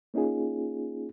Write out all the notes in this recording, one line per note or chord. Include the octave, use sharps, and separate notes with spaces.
A#3 C#4 D#4 F4 G#4